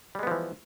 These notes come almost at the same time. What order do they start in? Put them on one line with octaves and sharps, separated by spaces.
G3 G#3 B3 F3 E3